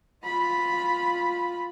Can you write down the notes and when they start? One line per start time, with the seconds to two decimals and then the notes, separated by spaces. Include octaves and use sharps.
0.25 F4 B5